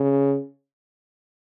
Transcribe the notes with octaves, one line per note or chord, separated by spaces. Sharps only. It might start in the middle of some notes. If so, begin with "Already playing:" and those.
Already playing: C#3